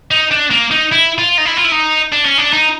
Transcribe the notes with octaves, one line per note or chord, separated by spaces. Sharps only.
D#4
D4
A#3
D#4
E4
F4
D#4
E4
F4
E4
D#4
D4
C#4
D4
D#4